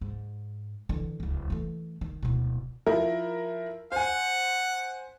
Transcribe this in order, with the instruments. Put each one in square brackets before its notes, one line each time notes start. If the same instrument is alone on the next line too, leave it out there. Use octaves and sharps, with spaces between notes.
[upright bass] G#2
D3 E3
D1 C#2
E3 A3
D#3
D1 B2
[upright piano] F3 E4 A#4
[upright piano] C5 G#5 [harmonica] F#5